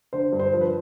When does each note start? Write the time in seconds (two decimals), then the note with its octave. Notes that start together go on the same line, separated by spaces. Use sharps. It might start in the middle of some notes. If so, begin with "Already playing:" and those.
0.13 D3 C5
0.33 G2
0.40 C5
0.53 F3
0.61 B4